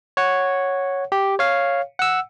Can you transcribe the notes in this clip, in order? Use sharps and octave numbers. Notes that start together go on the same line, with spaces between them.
C#5 F#5
G4
C#5 F5
F#5 E6